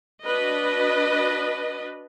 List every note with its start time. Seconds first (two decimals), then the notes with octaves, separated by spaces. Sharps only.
0.24 D4 F#4 B4 D#5